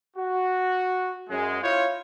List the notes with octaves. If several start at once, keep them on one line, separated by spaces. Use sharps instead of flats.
F#4
F#2 G#3
E4 F4 C5 C#5